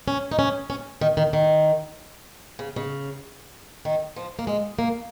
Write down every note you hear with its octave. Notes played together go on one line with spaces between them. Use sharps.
C#4
D#4
C#4
C#4
D#3
D#3
D#3
C#3
C#3
D#3
F3
A#3
G#3
A#3